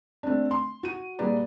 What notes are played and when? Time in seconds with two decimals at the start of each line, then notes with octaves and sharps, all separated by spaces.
0.23 A3 C4 D4
0.51 C6
0.83 F#4 D#7
1.19 A#2 G3 G#4 B4 D5 A#5